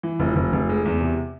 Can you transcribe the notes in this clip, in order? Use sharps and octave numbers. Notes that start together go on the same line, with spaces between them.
E3
F1
F1
F1
G#3
E2
C3